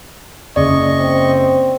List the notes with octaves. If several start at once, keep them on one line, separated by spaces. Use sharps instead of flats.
F#1 D5 D#5 C#6
C4